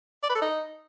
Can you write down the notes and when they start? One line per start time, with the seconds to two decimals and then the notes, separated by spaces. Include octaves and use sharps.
0.23 D5
0.29 B4
0.35 A4
0.42 D#4